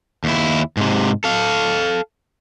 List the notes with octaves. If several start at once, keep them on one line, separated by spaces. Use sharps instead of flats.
D#2 E4
G#2 C3
A4 F5